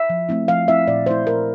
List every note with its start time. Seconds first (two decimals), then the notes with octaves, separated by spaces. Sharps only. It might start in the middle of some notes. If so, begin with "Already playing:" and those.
Already playing: E5
0.10 F3
0.29 A3 C4 E4
0.48 F3 F5
0.68 A3 C4 E4 E5
0.87 A#2 D5
1.06 A3 E4 C5
1.26 A#2 A#4